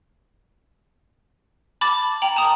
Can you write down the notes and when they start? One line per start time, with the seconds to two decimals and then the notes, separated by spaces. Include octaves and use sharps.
1.81 A5 B5 D6 A6
2.22 G5 A#5 F#7
2.36 A5 A#5 D#6